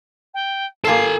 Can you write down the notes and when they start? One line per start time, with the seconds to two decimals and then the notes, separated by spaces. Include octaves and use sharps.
0.34 G5
0.85 A#3 F4 A4 G#5 A5 C7